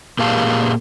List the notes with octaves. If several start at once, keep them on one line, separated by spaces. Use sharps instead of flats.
A#2 A#3 G4 G#4 F5 A5